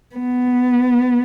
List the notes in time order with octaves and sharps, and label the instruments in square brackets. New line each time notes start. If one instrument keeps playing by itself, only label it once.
[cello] B3